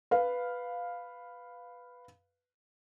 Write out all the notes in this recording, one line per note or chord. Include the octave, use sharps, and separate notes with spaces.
B4 F5